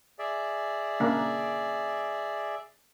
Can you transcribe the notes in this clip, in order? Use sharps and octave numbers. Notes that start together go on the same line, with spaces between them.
G#4 D5 E5
C#3 A#3 D4